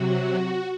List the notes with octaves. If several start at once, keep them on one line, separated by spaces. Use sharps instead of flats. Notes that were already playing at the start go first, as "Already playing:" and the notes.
Already playing: C3 F#3 F#4